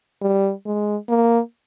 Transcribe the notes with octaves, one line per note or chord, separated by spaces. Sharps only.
G3
G#3
A#3